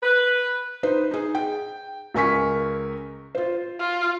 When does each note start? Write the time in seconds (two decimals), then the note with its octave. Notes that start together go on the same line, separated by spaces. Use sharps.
0.03 B4
0.83 D#4 B4 C5
1.11 D#4 G#4
1.35 G5
2.14 C#2 A#4 G#5 C#6 B6
3.35 F4 C5
3.79 F4